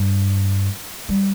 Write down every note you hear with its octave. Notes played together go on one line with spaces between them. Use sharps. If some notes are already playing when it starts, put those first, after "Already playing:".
Already playing: G2
G3